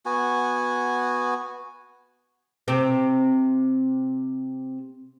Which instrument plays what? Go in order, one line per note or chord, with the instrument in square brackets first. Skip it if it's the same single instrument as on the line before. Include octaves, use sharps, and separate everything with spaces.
[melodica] B3 F#4 G#5
[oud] C3 C4 G4